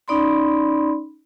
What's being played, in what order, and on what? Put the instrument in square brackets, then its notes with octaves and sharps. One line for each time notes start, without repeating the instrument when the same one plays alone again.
[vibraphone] C#4 D#4 D5 B5 C6